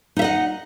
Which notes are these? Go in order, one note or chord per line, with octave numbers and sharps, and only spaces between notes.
D#4 D#5 E5 F#5